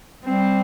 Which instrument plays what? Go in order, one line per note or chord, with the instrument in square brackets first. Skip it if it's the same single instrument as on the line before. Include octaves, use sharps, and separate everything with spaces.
[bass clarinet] G3 [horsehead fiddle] C4